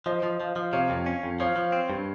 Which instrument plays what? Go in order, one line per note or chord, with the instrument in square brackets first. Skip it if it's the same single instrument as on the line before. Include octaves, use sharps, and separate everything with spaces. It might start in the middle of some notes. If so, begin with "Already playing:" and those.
[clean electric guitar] F3 [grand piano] C5 D#5
[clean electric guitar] F3
F3
F3
[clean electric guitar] C3 [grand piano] C#5 F5
[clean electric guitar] F2
C#4
F2
[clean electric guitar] F3 [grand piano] C#5 F5
[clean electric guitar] F3
C4
G2